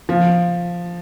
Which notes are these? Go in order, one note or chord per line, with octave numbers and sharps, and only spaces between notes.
F3